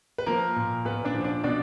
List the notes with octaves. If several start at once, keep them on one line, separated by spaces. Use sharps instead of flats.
B4
F3 A#3 A#4
A#2
A#2 B3 B4
D4 D5
F3
D4 D5
B2 D4 D5